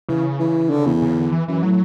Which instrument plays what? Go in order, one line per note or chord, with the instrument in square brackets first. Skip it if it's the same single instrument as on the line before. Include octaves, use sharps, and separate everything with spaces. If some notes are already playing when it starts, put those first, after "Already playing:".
[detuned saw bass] C#3 [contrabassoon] E3
[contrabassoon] E3
D3
E2
[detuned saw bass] C#3
D3
E3
[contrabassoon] F#2 [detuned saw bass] E3
[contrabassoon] A2 [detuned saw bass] F#3